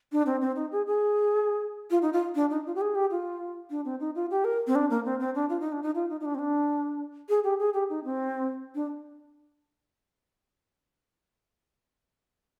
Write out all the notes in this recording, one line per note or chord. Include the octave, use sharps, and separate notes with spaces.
D4
C4
C4
D#4
G#4
G#4
F4
D#4
F4
D4
D#4
F4
G4
G#4
G4
F4
D4
C4
D#4
F4
G4
A#4
C4
D4
A#3
C4
C4
D4
F4
D#4
D4
D#4
F4
D#4
D#4
D4
C4
D4
G#4
G4
G#4
G4
D#4
C4
D4